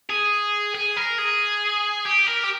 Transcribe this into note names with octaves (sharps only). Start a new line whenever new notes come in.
G#4
G#4
A#4
G#4
G4
A#4
G4